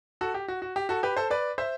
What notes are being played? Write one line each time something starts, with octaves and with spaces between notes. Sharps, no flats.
F#4 A4
G4
F#4
F#4
G4
F#4 A4
G4 B4
A4 C5
B4 D5
C5 E5